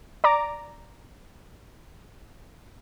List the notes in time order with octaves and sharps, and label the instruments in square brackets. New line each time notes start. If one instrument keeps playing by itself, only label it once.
[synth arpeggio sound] D5 A#5 D6